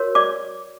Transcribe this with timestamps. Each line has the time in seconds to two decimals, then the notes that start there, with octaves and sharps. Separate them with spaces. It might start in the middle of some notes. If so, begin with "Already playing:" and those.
Already playing: F#4 A#4 C#5
0.15 D5 D6